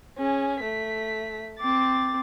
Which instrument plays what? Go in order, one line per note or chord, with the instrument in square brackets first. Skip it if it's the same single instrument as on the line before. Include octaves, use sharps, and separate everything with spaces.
[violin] C#4 G#4
A3 B6
[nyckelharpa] C4 D6 [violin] A6